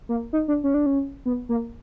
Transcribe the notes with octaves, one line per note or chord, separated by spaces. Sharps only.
A#3
D#4
D4
C#4
D4
C#4
B3
A#3